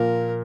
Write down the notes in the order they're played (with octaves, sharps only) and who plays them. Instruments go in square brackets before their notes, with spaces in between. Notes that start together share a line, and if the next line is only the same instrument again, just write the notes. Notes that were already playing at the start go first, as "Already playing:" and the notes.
Already playing: [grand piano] A#2 F3 A#3 [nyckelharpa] A#4